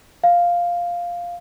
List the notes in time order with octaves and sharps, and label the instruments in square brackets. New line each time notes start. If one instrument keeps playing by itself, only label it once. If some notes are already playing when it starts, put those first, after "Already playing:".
[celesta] F5